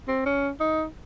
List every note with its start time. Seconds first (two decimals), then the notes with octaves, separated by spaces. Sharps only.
0.08 C4
0.25 C#4
0.60 D#4